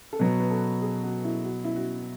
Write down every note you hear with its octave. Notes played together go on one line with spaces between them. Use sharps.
A4
B2 F#3 B3 B4
B4
A4
G#4
F#4
E4
F#4
E4
F#4